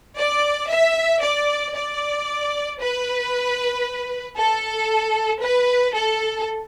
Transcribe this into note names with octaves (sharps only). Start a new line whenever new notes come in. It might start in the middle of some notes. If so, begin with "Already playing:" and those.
D5
E5
D5
D5
B4
A4
B4
A4